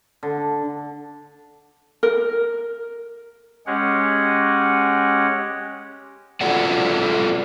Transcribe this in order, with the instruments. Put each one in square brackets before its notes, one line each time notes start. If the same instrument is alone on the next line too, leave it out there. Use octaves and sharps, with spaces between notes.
[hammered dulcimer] D3
[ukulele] A#4
[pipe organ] G#3 C#4 G4 G#4 C#5 F#5
[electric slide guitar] F4 F#4 A4 D5 F#5